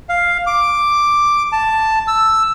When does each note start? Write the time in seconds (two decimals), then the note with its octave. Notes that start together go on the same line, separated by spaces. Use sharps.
0.09 F5
0.47 D6
1.52 A5
2.08 E6